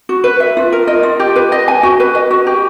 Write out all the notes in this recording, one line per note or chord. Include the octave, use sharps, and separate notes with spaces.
F#4
B4
E5
F4
A#4
D#5
F4
G4
B4
D#5
G#5
F#4
B4
D#5
F#4
G4